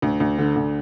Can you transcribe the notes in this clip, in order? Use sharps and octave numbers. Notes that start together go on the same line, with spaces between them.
D2
D2
D3
D2